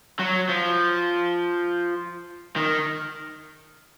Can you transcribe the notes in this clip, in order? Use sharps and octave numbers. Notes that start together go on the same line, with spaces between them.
F#3
F3
D#3